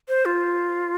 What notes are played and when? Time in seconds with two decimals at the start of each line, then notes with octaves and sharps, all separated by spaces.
0.08 C5
0.25 F4